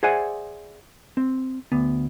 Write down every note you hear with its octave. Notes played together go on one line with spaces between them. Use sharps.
G#4 C5 D5 E5 F#5 G#5
C4
D2 B3